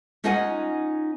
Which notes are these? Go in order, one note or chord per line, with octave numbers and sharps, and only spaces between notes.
C#4 D#4 F4 D#5 F#5 G#5